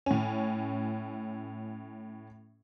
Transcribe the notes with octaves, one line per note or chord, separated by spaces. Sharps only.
A2 C#4